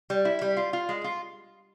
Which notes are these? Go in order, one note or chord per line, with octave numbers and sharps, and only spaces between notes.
G3
E4
G3
F4
F4
G#3
F4